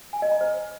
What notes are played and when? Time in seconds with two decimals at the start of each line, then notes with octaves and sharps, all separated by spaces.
0.13 G#5
0.22 D#5
0.32 A#5
0.41 C5